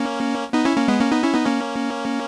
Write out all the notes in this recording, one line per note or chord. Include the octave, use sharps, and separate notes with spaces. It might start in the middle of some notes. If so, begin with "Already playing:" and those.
Already playing: A#3 C#4
B3 D#4
C#4 E4
A#3 C#4
G#3 B3
A#3 C#4
B3 D#4
C#4 E4
B3 D#4
A#3 C#4